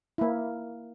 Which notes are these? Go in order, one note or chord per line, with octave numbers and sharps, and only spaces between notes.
A#3 E4